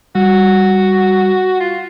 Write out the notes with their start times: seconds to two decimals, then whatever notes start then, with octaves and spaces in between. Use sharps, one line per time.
0.15 G3 F#4
1.60 F4